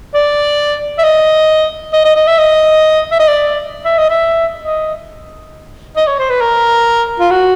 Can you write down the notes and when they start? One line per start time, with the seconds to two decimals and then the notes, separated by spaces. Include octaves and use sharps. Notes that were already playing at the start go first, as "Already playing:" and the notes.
0.14 D5
0.98 E5
1.03 D#5
1.93 D#5
2.05 D#5
2.16 D#5
2.27 E5
2.38 D#5
3.11 E5
3.19 D#5
3.28 D5
3.85 E5
3.98 D#5
4.10 E5
4.62 D#5
5.96 D#5
6.07 C#5
6.19 C5
6.30 B4
6.41 A#4
7.20 F4
7.31 F#4